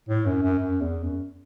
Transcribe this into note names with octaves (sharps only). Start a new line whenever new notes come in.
A2
F#2
F#2
F#2
E2
F#2